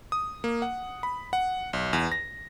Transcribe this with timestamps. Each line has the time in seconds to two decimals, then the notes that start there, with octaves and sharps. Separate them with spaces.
0.12 D#6
0.44 A#3
0.62 F#5
1.03 B5
1.33 F#5
1.73 B1
1.93 E2
2.12 A#6